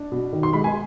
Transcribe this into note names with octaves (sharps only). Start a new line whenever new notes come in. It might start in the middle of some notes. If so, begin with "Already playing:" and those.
Already playing: D4
B2
D#3
C6
G#3 B5
G#5